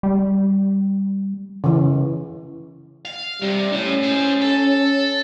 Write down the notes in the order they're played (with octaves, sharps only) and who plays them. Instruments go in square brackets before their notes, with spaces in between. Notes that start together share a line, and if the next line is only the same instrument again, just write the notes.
[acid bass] G3
[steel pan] C#3 E3
[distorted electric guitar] F5
[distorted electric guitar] C3 [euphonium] G3
[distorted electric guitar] A2 [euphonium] C#4
[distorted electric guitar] G#4 C5
A4